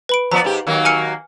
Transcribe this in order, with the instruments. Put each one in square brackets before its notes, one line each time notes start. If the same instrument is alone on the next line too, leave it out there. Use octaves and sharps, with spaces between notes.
[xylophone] B4 B5 D7
[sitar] F3 B3 D5 [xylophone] A#5
[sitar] G#2 G4
D#3 F#3 A#3
[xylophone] G#5 F6 C#7